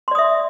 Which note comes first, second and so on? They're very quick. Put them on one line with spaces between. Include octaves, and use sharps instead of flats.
C6 D5 D#6 E5